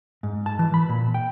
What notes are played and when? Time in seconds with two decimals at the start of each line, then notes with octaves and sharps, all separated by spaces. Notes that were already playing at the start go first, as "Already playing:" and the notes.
0.23 G#2
0.46 A5
0.59 E3
0.74 B5
0.89 A#2
1.14 G5